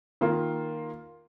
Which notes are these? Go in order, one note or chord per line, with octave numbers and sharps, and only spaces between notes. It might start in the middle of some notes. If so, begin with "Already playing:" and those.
D#3 A#3 F4